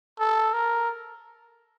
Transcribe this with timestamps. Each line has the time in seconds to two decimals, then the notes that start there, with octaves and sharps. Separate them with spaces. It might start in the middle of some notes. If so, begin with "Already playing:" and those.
0.19 A4
0.54 A#4